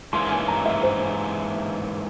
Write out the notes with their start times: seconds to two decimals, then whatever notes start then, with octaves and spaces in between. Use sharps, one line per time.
0.13 G#2 E3 A#3 C#4 C6
0.30 G#5
0.48 A#5
0.66 E5
0.83 C5